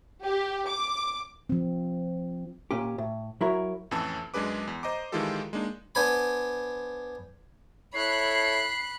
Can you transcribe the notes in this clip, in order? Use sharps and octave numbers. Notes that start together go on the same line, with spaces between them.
G4
D6
F3 C4
A#2 C#4 G4
A2
F#3 E4 A#4 C#5
F2 A2 E3 C#4 A5 E6
F#2 G#3 D4 G#4 B4 D6
E2
C5 D#5 A#5 D6
D#3 E3 G#3 F4 G4 A4
G#3 A#3 D4 D#4
B3 D4 C5 G#5 B5
E4 A4 C#5 B5 F#6 C7